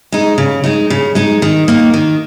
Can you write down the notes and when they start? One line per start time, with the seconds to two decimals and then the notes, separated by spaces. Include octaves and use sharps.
0.12 G#3 D#4
0.38 C#3
0.64 G#3 D#4
0.90 C#3
1.15 G#3 D#4
1.42 D#3
1.68 A#3 D#4
1.94 D#3